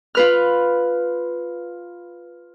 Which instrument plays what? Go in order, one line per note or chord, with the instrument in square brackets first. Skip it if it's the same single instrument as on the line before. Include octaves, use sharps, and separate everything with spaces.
[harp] F4 B4 F6